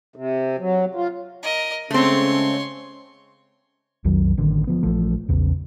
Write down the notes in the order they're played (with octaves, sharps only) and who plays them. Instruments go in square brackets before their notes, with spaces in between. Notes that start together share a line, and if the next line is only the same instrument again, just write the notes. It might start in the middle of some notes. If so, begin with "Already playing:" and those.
[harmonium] C3
F#3
F4
[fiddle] A#4 D#5
[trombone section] C#3 G#3 C#4 [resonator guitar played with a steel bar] A3 C4 [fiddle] C#5 C6
[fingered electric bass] B1 F2 D#3 F#3
A1 D3 D#3
F3 B3
A#1 E3 F3 A3
A#1 E2 C#3